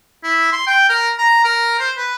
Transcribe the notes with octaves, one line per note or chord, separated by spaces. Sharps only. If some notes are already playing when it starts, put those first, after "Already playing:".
E4
C6
G5
A#4
A#5
A#4
C5
B4